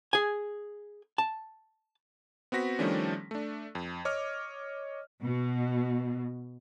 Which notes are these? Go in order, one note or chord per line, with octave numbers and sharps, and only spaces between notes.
G#4 G#5
A5
B3 C4 F#4 A#6 B6
D#3 F3 G3 A3 C#4 D4
A3 D4
F2
C#5 D#5 D6 F6
B2